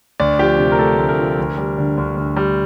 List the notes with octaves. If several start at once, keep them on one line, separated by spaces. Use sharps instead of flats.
D2 D5
F3 G4
C3
A#4
A3 A4
D2
A#4
F3
D2
G3
D3
D2
D2
G3